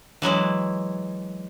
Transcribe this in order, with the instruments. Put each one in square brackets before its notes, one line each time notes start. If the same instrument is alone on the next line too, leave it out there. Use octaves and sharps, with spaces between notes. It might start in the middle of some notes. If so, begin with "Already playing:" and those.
[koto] E3 F#3 G#3 E4